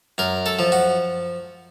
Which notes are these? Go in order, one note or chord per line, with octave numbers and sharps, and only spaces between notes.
F#2 A#4
A4
F3
F#4